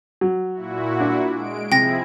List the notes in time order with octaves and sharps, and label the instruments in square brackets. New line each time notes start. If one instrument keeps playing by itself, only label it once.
[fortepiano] F#3
[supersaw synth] A#2 E4 F#4
[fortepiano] D4
[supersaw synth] G#3 D7
[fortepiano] C3 [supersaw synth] F3 E4 G#4 [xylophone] G5 A#6